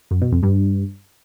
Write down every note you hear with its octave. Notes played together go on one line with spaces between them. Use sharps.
F#2
B2
F2
G2